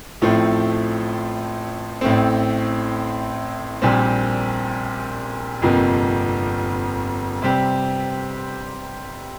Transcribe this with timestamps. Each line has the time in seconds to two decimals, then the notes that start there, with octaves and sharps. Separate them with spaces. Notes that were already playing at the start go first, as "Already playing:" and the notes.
0.22 A1 A2 F3 A3 C4
2.01 A1 A2 A3 C4
3.82 A#1 A#2 G3 C4 G4
5.62 G1 F2 C3 F3 A#3
7.42 C3 G3 C4 G4